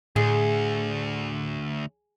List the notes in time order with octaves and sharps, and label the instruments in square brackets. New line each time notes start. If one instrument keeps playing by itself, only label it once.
[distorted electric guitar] D2 [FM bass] A2 [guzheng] G#4